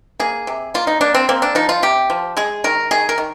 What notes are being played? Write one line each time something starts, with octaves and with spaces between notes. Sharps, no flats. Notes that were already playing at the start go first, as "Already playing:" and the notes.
A#3 G#4
C3
A#3 F4
D#4
A#3 D4
C4
A#3 C4
D4
F3 D#4
F4
C3 G4
F3
G#3 G#4
D#3 A#4
D#3 G#4
A#4
D#3